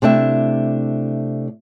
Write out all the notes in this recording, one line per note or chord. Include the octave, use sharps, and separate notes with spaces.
C3 A3 D4 E4 E5